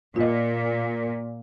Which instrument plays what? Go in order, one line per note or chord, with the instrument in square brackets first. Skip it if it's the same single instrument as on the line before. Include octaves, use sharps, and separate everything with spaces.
[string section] A#2 [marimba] F4 D#5